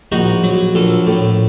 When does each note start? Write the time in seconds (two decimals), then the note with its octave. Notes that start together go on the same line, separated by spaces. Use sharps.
0.12 A#1 D#4 F#4
0.43 F#3
0.75 A#1 F4 A4
1.07 A2